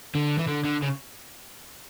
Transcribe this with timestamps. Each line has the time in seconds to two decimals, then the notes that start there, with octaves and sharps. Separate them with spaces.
0.15 D3
0.39 E3
0.48 D3
0.65 D3
0.83 C#3